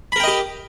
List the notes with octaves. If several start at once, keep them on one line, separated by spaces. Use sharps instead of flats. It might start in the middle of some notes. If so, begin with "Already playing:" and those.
G4 A#4 D#5 G5 B5